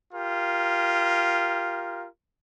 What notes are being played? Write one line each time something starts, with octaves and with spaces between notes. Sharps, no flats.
F4 G4 A#4